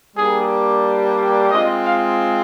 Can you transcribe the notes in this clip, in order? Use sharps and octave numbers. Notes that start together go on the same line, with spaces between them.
G3 A#3 D4 G4 G#4
G#3 C4 F4 D#5
F5